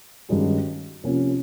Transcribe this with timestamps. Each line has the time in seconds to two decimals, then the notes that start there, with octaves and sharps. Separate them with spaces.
0.29 G2 D#3 G#3 C#4 F#4
1.04 C3 F3 A#3 C#4